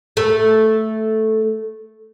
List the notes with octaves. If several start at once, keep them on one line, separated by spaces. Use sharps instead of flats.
A3 A4